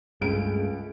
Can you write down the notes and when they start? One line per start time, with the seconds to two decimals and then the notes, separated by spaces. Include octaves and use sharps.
0.21 C#2 G2 A3 G#4 D7